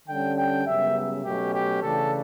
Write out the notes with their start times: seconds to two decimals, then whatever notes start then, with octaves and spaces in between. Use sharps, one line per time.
0.08 D3 G3 C#4 G5
0.38 G5
0.66 F#2 C#3 G3 B3 E5
1.24 B2 F#3 A3 C#4 G4
1.54 G4
1.82 C#3 E3 A3 D4 A4